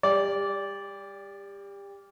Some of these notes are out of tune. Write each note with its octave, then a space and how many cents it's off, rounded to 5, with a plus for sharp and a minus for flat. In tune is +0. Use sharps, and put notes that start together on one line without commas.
G3 +30 D5 -15